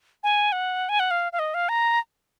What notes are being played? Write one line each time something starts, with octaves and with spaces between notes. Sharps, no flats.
G#5
F#5
G#5
F#5
F5
F5
D#5
F5
A#5